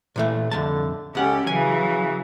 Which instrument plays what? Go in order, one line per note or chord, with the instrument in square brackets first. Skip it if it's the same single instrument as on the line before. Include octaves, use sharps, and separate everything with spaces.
[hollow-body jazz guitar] A#2 E3 A3
[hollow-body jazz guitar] C2 F2 A5 [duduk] D3
[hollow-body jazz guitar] C#2 F#5 [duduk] C#4 [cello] G4 A4
[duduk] C#3 [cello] E3 F#3 [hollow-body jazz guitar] G#5